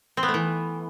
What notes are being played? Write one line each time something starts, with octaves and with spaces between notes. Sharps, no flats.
C4
B3
A3
E3